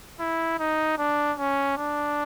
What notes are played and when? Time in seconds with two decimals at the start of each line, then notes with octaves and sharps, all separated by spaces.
0.20 E4
0.59 D#4
0.98 D4
1.38 C#4
1.77 D4